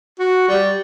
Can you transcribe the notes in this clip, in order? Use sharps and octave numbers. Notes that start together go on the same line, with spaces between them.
F#4
G3